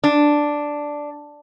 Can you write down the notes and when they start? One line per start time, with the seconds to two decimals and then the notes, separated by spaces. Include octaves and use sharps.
0.04 D4